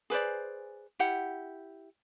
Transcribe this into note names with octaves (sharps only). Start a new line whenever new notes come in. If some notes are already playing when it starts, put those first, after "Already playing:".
G#4 B4 C5 D5
E4 G4 F#5